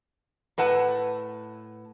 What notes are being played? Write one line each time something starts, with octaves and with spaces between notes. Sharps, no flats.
A2 B4 F#5 A5